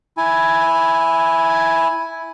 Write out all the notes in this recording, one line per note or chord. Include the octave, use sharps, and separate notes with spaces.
E4 G#5